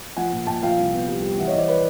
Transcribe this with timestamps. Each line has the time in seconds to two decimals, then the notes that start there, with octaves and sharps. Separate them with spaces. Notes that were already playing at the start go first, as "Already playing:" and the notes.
0.17 F3 F#5 G#5
0.32 A#2
0.47 A#2 G5 A5
0.63 F3 F5 G5
0.78 C2
0.93 B3
1.08 G3
1.22 G3
1.38 E3 E5 F#5
1.48 C#5 D#5
1.53 E3 C5 D5
1.68 B4 C#5